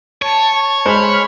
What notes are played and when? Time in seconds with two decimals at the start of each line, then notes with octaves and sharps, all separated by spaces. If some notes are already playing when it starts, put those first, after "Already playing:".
0.22 C#5 A5
0.85 G#3 C5 B5 F6